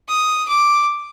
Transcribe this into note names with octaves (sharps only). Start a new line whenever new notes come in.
D#6
D6